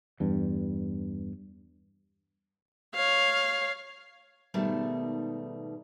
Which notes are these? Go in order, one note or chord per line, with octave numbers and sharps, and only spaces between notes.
E2 G2
C#5 F5
G#2 B2 D#3 G3 A3